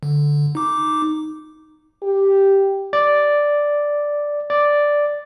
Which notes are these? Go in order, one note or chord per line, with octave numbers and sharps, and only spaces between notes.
D3
D#4 D6
G4
D5
D5